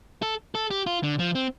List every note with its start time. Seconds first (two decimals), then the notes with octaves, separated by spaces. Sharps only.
0.22 A4
0.55 A4
0.71 G4
0.87 F4
1.03 D3
1.19 F3
1.35 C4